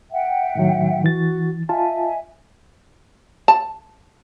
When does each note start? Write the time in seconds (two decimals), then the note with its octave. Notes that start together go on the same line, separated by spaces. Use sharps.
0.12 E5 F#5 G5
0.55 A2 D#3 F#3
1.04 E3 F#4 A6
1.69 F4 D#5 E5 G#5 A5
3.48 A5